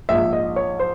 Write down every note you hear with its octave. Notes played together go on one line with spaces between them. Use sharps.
A#1 G#2 F3 E5
D#5
C#5
C5